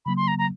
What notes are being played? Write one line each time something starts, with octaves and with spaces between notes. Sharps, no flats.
C#3 F#3 A#3 B5
C6
A#5
A#5